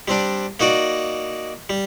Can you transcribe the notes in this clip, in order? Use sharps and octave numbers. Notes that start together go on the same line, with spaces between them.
G3 C4 D4
A#3 D#4 F#4 D5
G3